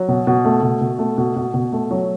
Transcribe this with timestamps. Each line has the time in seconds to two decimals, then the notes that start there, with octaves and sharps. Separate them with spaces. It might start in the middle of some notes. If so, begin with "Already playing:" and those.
Already playing: F#3
0.08 B2
0.27 B2
0.45 A3
0.62 B2
0.81 B2
0.99 A3
1.18 B2
1.36 B2
1.54 B2
1.73 A3
1.91 F#3